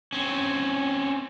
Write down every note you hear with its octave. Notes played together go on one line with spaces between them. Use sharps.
C4 C#4